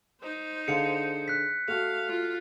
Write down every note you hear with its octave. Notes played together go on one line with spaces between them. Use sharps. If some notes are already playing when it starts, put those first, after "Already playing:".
D#4 C5
D3 G#4 F5 C#7
F#6 B6
A3 F#4 F5
F4